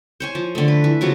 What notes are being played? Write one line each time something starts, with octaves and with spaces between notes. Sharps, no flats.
C5 C#5 G#5
F3
D3 A3
B4
E3
C#3 F3 F#3 B3